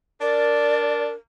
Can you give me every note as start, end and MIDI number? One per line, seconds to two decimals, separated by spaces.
0.21 1.11 62
0.21 1.12 70
0.21 1.05 74